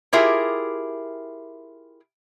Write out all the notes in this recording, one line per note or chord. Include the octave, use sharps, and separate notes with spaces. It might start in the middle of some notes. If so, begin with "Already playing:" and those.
E4 F4 G4 G#4 A#4 E5